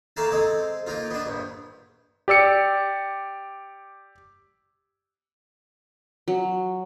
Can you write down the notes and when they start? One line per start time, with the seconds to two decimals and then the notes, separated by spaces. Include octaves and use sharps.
0.17 A3 A#3 A#4 F5 A5
0.32 G#3 C4 A4
0.87 A#3 D#4 F4
1.10 B3 D4
1.26 A#1 G2
2.28 G4 D5 E6 C#7
6.28 F#3